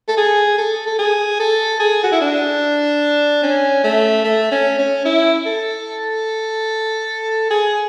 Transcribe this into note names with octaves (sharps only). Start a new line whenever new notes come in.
A4
G#4
A4
A4
G#4
A4
G#4
F#4
E4
D4
C#4
A3
A3
C#4
C#4
E4
A4
G#4